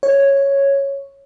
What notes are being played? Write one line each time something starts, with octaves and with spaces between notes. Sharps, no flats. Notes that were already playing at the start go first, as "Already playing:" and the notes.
C#5